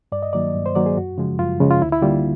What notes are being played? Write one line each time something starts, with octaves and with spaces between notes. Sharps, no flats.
G2 D5
D#5
D#3 F#3 A#3 D5
G2
C5
D#3 F#3 A#3 D5
G#4
F#2 F#4
C#3 F3 G#3
F#2 F4
C#3 F3 G#3
F4
D2 E4
E4
D3 G3 A#3 F4